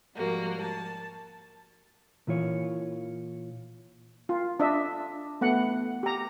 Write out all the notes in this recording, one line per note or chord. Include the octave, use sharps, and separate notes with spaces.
G#2 F3 G3 A#3 F#4
A5
A#2 E3 F4 C#5
F4
D4 D#5 E5
A3 B3 F#5
G4 A#5